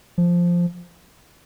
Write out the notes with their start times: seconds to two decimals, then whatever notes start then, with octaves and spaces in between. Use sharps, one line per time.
0.18 F3